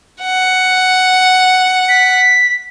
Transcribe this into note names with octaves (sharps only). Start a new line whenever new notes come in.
F#5
B6